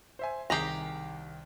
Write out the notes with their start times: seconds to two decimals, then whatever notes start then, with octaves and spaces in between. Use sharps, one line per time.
0.19 C5 E5 G#5
0.50 C2 D#3 G4 G#4 A#5 C7